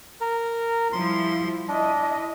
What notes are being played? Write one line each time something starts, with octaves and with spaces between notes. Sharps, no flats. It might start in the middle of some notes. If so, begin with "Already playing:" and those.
A#4
F3 G3 E4 C6
D4 E4 D#5